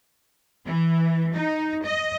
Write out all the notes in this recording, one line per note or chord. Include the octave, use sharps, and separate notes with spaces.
E3
D#4
D#5